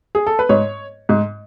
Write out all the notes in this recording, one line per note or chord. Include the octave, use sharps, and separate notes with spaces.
G#4
A4
B4
G#2 C#5
G#2